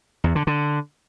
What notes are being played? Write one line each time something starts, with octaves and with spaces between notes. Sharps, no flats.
E2
D3
D3